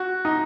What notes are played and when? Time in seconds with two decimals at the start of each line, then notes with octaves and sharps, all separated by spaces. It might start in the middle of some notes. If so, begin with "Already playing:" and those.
Already playing: F#4
0.25 D#4